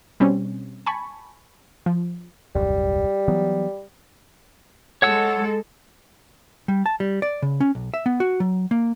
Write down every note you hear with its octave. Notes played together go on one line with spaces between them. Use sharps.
B2 G3 C4 C#4
G#5 A5 B5 C#6
F3
D#1 C2 F#2 G3
E3 F#3 B3
G#3 A4 C#5 F#5 E6
G3
A5
G3
D5
C#3
C#4
B1
E5
B3
F#4
F#3
A#3